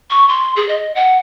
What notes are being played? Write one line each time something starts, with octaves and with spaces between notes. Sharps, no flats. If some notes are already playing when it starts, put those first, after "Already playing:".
C#6
C6
G#4
D#5
F#5